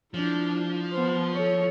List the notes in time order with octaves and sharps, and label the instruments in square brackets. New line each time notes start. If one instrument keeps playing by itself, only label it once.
[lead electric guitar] F3 [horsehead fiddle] D4 E4
[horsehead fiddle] B3 C5
A4 C#5